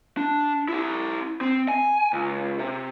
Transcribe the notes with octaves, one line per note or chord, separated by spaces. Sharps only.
D4
E4 G4
C4
G#5
C#2
C3